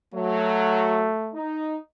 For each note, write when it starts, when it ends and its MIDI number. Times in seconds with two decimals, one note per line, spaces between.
0.14 1.11 54
0.14 1.36 57
1.34 1.77 63